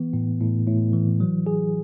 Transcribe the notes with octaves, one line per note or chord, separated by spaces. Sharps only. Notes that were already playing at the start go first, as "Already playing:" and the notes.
Already playing: E3 B3
A2
A2
A2
E3
F#3
G#4